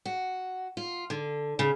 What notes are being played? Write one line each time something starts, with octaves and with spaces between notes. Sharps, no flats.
F#4
F4
D3
C#3